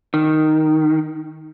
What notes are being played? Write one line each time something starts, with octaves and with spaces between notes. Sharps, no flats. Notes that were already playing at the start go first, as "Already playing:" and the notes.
D#3